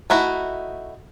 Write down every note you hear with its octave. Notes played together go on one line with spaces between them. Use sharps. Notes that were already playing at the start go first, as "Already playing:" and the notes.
A3 D#4 E4 F#4